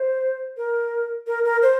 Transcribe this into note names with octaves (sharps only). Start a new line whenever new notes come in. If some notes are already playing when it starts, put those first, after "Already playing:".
Already playing: C5
A#4
A#4
A#4
C5